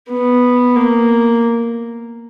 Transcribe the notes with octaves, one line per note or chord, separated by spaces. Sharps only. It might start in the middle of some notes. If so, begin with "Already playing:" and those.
B3
A#3